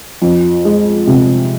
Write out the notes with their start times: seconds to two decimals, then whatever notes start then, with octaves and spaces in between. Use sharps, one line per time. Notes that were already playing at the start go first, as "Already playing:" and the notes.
0.22 F2
0.65 G#3
1.07 C3